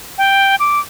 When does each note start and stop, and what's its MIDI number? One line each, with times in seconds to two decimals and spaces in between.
0.18 0.55 79
0.59 0.79 86